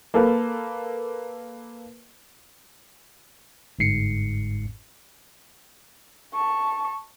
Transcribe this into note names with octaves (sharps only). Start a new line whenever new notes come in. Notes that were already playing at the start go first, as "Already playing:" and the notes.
A#3 A4 B4
G1 G#2 C7 C#7
A5 C#6